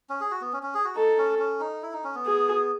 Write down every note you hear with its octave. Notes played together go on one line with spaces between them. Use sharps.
C#4
G#4
F#4
B3
C#4
C#4
G#4
F#4
D#4 A4
C#4
C#4
D#4
E4
D#4
C#4
B3
G#4